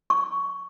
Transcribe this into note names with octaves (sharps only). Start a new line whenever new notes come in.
C#6